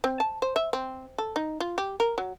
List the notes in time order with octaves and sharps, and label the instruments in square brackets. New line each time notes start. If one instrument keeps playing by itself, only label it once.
[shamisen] C4
A5
C5
E5
C4
A4
D#4
F4
G4
A#4
F#3